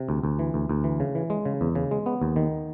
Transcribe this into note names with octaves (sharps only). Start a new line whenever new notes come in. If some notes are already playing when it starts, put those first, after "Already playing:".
Already playing: C3
D2
D2
E3
D2
D2
E3
C#3
E3
G#3
C#3
E2
C#3
G#3
B3
D#2
D#3